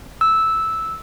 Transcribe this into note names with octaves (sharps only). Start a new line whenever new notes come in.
E6